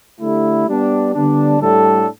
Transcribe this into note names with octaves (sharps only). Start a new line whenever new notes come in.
D3 A3 E4 G4
G3 B3 D4
D3 G3 B3 D4
A2 G3 D4 A4